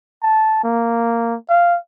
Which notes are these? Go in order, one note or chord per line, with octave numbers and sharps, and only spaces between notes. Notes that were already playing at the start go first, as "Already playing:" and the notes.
A5
A#3
F5